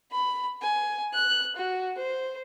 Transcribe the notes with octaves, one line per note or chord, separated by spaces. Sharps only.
B5
G#5
F#6
F#4
C5